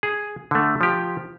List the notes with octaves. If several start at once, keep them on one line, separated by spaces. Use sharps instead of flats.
G#4
D3 A3
F3 G4